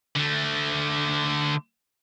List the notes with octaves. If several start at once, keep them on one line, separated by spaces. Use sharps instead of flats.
D3 A3